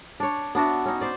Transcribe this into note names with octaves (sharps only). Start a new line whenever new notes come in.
D4 C#5
B3 D4 F#4 E5
C#4 D#4
C5 D5